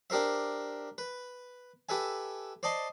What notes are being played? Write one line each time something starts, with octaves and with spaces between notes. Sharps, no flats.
D4 G4 A#4 C5 E5
B4
G4 A4 B4 E5 G#5
C5 D5 D#5 A5 C6